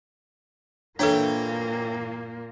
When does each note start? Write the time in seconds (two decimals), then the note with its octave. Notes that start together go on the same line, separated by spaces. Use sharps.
0.99 A#2 E3 A#3 D4 A4 C#5 G5